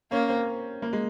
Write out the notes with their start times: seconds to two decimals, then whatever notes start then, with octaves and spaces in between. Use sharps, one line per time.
0.11 A#3 C#4
0.29 C4
0.82 A#3
0.93 G#3